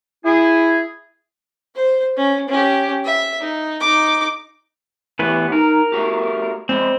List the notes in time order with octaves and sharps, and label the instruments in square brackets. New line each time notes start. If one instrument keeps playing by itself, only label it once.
[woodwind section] E4 G#4
[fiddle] C5
C#4
C#4 G4
E5
D#4
D#4 D6
[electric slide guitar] A2 G4 [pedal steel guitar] E3 B3 B4
[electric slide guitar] D#4 [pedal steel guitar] A#4
[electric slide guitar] A3 F#4 G4
[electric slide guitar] G#3 D5 D#5 [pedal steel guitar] C4